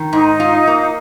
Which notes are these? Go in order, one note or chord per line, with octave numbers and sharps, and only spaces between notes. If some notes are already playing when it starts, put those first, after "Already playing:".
Already playing: D#3
G#2 D#4
F4
A#3